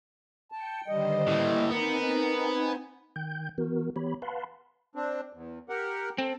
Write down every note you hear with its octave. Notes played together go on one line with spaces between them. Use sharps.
G5 A5 C#7
D3 D#3 G3 C5 D#5
A2 E3 A#3
B3 C4 D#4 A#4 G#5
D#3 G5 G6
E3 B3 F#4 A#4
E3 B3 G4 C#5 B5
B4 F5 F#5 A5 B5 C6
C4 D4
E2
G4 A#4 F#5
C4 A4